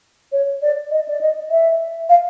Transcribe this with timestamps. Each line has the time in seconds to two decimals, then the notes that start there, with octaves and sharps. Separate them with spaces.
0.32 C#5
0.62 D5
0.91 D#5
1.08 D5
1.21 D#5
1.50 E5
2.09 F5